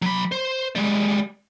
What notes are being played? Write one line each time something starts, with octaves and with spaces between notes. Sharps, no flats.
F#3 B5
C5
G3 G#3